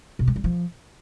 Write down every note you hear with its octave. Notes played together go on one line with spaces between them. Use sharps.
B2
G#3
G3
F3